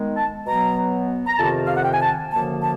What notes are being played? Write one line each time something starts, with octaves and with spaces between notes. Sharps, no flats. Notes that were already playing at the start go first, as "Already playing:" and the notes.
Already playing: D#3 G#3 B3
A5
B2 F#3 B3 A#5
A#5
F2 C3 D#3 A5
F5
F#5
G5
G#5
A5
F#2 D3 F3 A#3 A5
A5